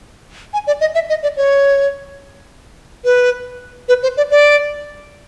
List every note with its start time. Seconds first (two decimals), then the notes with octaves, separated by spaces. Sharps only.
0.53 G#5
0.67 D5
0.81 D#5
0.95 E5
1.09 D#5
1.23 D5
1.37 C#5
3.05 B4
3.89 B4
4.03 C5
4.17 D5
4.31 D5